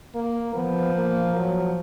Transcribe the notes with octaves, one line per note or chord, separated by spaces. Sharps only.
A#3
F3 B3
A#3
F#3